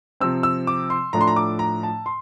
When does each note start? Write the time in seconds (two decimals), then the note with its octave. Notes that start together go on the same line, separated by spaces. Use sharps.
0.20 C3 F3 C4 E6
0.43 E6
0.67 D6
0.90 C6
1.13 A2 F3 A3 D4 A#5
1.21 C6
1.27 A#5
1.36 D6
1.59 A#5
1.83 A5
2.06 C6